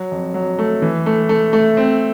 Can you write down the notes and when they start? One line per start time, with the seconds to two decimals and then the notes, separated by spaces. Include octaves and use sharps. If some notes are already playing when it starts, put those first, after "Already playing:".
Already playing: F#3
0.12 F2
0.34 F#3
0.59 A3
0.82 E3
1.06 A3
1.29 A3
1.53 A3
1.77 C4